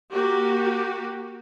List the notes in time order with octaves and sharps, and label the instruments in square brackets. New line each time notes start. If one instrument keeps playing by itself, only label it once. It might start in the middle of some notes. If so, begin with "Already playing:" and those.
[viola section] A#3 F#4 G4